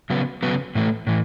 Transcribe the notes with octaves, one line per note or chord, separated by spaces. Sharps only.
C#3 F#3 B3
C#3 F#3 B3
A2 E3 A3
A2 E3